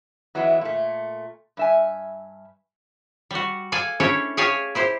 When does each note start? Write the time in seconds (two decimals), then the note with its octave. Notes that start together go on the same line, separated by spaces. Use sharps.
0.35 E3 F#3 G#3 B3 E4
0.61 A#2 A3
1.57 G2 E5 G#5
3.31 G3 F#4
3.72 A4 D5 F5 G#5
4.00 C#4 D4 E4 G4 A4 C#5
4.37 G4 G#4 C#5 F5 G#5 A5
4.75 E4 G4 C5